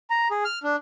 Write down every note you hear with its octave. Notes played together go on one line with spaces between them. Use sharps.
A#5
G#4
F6
D4